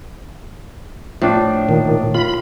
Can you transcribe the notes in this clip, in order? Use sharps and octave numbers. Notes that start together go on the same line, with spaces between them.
A2 F3 D4
A#2 D#3
F4 B5